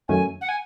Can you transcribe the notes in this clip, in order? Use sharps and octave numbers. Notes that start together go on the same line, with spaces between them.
F#2 D#3 F#3 A3 C#4 G#5
F#5
G#5